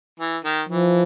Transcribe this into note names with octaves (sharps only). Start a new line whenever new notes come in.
E3
D#3
E3 F3